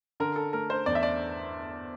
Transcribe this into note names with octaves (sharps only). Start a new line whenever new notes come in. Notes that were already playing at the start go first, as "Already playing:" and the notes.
D3 A#4
A4
A3 A#4
C5
E2 D5
E5
D5